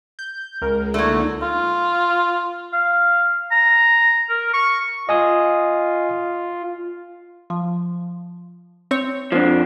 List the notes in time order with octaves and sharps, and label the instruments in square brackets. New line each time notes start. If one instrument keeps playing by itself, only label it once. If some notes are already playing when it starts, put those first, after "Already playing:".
[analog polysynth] G6
[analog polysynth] C#2 [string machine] G#3 [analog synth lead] A#4
[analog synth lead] D3 [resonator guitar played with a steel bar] F#3 A3 [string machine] A#3 D#4
[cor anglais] F4
[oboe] F5
A#5
A#4
C#6
[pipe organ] F4 [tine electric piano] D#5 G#5 D#6
[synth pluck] F3
C4 C#5 C#7
[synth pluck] F2 [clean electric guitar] F3 C4 D4